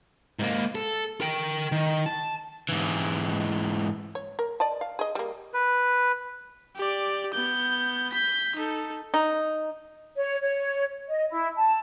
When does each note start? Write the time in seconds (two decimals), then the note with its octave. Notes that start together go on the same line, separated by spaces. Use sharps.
0.39 G#2 A#3
0.75 A4
1.21 A#4 G5
1.72 D#3
2.06 A5
2.69 G#2 E3
4.15 C#5
4.39 A#4
4.60 D5 D#5 A5
4.81 F5
4.99 G#4 D#5
5.15 G3 A#3
5.54 B4
6.76 G4 D5
7.33 B3 G6
8.13 G6 B6
8.56 D#4 A4
9.14 D#4
10.16 C#5
10.41 C#5
11.09 D#5
11.30 E4
11.57 A5